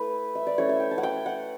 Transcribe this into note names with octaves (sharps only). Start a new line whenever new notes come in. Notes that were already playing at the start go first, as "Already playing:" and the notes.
Already playing: A3 E4 B4
E5
D5
A3 C#4 E4 C#5
E5
G5
A5
F#5
G5
F#5